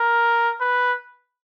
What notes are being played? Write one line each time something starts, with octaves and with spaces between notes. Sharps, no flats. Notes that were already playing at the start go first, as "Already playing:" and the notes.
Already playing: A#4
B4